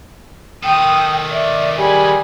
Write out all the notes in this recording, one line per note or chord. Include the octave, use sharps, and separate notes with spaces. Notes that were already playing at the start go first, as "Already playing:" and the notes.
D#3 A4 G5 D#6
D5 E5
G3 G#4 G#5 B5